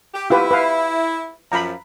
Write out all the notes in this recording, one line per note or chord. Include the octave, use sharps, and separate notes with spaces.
G4
E4 F4 G4 B4
B4 F5
F#2 F3 A#5 B5